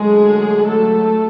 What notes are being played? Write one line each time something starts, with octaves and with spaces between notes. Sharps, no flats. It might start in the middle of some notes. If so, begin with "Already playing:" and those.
Already playing: D3 F#3 G#3 A3 G#4
A3 A4